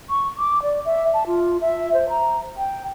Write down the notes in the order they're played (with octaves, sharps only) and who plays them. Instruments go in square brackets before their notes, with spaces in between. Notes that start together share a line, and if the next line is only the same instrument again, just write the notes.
[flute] C#6
D6
D5
E5
A5
F4
E5
C5
A#5
G5